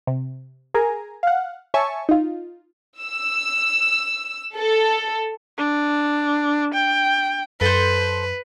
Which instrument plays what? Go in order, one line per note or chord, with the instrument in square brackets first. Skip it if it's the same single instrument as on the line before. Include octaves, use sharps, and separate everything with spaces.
[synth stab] C3
G#4 A#4 G#5 A#5
F5 F#5
C#5 E5 G#5 A5 C#6
D#4 F4
[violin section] E6
A4
[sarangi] D4
G5
[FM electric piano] F#2 [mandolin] A4 C5 [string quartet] B4